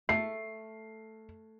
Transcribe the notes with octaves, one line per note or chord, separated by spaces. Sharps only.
A3 C7